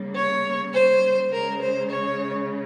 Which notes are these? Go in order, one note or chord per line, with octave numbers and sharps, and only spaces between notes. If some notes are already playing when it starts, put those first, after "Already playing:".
Already playing: C#3 G3 A#3
C#5
C5
C#3 G#3 A#4
C5
C#5